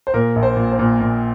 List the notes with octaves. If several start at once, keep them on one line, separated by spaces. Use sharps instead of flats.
C5
A#2 A#4
A#1
C5
A#2
C5
A#2
A#2